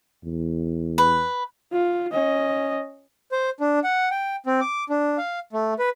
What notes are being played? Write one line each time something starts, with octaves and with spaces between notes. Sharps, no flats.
E2
B4
F4
C#4 D#5
C5
D4
F#5
G5
C4
D6
D4
F5
A3
B4